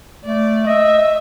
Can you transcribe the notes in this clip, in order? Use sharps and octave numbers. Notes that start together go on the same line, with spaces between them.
A3 D5
D#5 E5